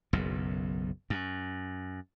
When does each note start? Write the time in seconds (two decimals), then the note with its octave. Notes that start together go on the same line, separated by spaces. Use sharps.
0.13 F#1 B1 F#2
1.10 F#2